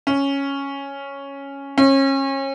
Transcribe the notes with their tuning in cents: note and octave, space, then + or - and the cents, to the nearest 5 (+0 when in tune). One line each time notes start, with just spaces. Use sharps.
C#4 +0
C#4 -30